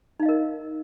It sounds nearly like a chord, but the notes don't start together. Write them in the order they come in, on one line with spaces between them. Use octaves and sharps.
D#4 F5 D#5 A#4